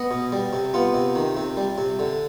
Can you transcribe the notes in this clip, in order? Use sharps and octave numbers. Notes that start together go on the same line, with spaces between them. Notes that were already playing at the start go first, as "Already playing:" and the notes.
Already playing: B3 D#5
B2
G3
C3
B3 F4
C3
D#3
C3
G3
C3
D3